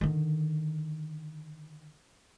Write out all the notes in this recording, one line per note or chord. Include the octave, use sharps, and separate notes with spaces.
D3 D#3